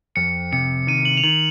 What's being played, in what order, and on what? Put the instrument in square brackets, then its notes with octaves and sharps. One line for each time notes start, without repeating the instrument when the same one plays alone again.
[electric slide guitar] F2 [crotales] C#7
[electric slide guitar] C3 [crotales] C#7
[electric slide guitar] D#3 [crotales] D#7
[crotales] F#7
F7
[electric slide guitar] D#3 [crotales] F#7